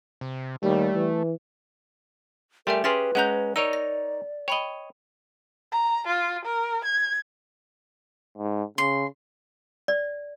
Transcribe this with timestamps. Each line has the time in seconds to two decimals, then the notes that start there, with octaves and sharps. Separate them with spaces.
0.21 C3
0.63 D#2 G3 A3
0.95 E3
2.67 G3 A3 G4 A#4 E5 G#5 C6
2.84 C#4 G4 G#4 B4 C6 F6 A6
3.15 G#3 C#4 F#5 A#5 F#6 G6
3.56 D#4 A#4 C#5 D5 E6 D7 D#7
3.73 A#6
4.48 C#5 D#5 G5 B5 F#7
5.72 A#5
6.07 F4
6.45 A#4
6.85 G#6
8.38 G#2
8.78 C#3 C6
9.88 D5